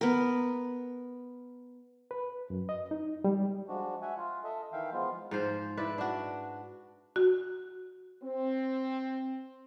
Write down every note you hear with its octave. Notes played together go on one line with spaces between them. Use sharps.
B3 A#4
B4
F#2
D#5
D#4
G3
F3 G#3 D4 F#4
E5 F#5 G#5
F4
A4 D#5 E5
D#3 E3 E5 F5 G5
F3 G#3 B3 F4
G#2 F3 C5
E4 B4 D5
D4 F#4
F#4
C4